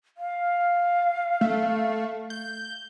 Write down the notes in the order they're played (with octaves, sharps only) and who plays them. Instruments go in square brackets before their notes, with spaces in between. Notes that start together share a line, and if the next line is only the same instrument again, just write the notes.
[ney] F5
[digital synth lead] A3
G6